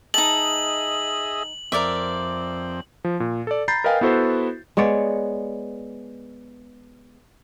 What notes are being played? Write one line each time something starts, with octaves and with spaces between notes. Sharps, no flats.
D#4 G#4 D#5 E5 A5 F#7
F2 C4 A#4 D5 E5
F3
A#2
A4 D5
A#5 B5 G6 A6 C7
A#4 B4 D#5 F5 G5 G#5
B3 E4 F#4 A4 C5
G#3 B3 C#5 D5